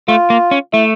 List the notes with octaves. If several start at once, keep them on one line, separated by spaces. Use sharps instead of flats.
A3 F4
A#3
C#4
A3 E4